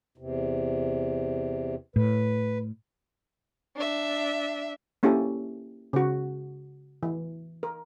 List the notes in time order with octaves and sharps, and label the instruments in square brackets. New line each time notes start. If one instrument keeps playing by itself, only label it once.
[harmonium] E2 C3
[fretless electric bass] A2 [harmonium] B4
[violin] D4 E5
[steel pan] A#3 C#4 E4 G4 A4
C#3 F#4
E3
A#4